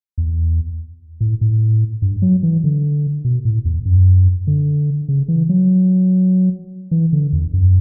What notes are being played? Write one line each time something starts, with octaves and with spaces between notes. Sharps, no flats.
E2
A2
A2
G2
F#3
E3
D3
B2
A2
E2
F#2
D3
C#3
E3
F#3
E3
D3
E2
F#2